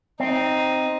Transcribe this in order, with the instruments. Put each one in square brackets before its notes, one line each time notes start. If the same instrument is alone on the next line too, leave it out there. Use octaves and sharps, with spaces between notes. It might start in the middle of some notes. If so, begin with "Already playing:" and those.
[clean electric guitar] C4 [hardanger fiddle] D#4